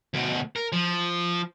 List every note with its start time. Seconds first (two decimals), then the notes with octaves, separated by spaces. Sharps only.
0.14 D2 B2
0.56 A#4
0.72 F3